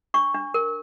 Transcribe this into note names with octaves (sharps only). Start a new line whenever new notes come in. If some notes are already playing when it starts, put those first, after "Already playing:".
D4 C#6
D4
A#4